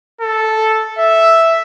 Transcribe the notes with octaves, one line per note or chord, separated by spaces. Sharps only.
A4
E5